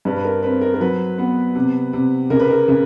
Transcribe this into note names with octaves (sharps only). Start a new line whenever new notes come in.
G2 B4
B4
A#4
C4 B4
A#4
A#4
F#3 B4
B3
C3
C3
C#3 A#4
B4
A#4
C#3